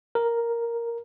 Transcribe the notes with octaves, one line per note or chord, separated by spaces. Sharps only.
A#4